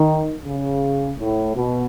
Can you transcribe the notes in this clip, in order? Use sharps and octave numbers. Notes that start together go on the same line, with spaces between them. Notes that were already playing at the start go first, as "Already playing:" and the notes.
Already playing: D#3
C#3
A2
B2